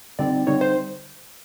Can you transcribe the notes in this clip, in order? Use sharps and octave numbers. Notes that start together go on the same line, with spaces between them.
D3 G3 C4 D#4 D5
D3 G3 C4 D#4 C#5
C5